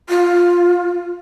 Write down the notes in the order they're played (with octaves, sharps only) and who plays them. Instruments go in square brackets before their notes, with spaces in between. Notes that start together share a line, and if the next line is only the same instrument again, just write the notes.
[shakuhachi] F4